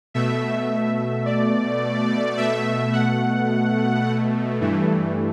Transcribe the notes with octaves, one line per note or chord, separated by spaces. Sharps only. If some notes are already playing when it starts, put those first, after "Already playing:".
B2 A3 E5
D5
B2 A3 E5
F#5
G2 E3 A3